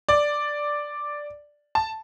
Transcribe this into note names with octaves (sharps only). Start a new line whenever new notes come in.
D5
A5